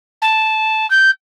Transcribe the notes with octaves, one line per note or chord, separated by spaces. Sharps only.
A5
G6